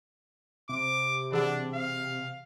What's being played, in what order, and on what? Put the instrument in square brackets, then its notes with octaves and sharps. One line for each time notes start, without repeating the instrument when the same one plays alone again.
[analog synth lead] C3 [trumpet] D6
[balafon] E3 G#4 F#5 [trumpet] D4
[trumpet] F5